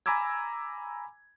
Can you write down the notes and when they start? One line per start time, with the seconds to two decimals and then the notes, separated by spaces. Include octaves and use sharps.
0.06 G#5 A#5 B5 D6 E6 G#6